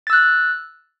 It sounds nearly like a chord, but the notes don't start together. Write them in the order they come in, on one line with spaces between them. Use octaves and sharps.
A6 E6 F#6